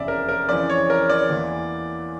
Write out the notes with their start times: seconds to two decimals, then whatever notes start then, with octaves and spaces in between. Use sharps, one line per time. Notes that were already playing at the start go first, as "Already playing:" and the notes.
Already playing: F1 E2 C#3 D5 E5
0.08 A#4
0.29 A#4
0.49 F2 C#3 E3 D5
0.70 C#5
0.90 A#4
1.09 D5
1.30 E2 E3 A#3